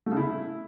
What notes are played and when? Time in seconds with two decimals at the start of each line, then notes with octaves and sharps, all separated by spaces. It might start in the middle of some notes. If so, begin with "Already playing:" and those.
0.06 A3
0.12 C#3
0.17 E4